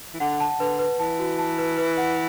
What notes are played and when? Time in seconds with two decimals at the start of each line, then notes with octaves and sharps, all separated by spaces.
0.14 E3
0.20 D3 F#5
0.40 A5
0.60 D3 B4
0.79 B4
0.99 E3 A5
1.19 F#4
1.38 A5
1.58 B4
1.77 B4
1.97 F#5